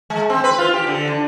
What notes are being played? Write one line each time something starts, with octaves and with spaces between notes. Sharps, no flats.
G#3
C4
B4
F4
G4
D3
D4